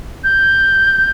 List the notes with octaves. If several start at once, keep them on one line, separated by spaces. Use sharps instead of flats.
G6